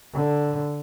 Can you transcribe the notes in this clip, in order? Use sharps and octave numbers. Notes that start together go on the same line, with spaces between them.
D3